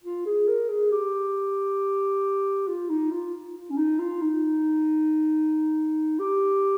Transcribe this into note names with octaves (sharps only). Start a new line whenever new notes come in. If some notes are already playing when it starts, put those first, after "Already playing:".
F4
G#4
A#4
G#4
G4
F4
D#4
F4
F4
C#4
D#4
F4
D#4
G4